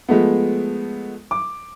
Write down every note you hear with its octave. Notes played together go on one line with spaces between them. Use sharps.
F3 G#3 A3 B3
D6